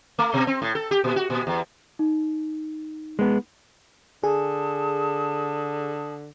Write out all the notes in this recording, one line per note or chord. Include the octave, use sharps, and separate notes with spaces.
A3
B2
C4
A2
A4
G4
A#2
F#4
A#2
E2
D#4
G#3 B3
D3 G#4 A5 D#6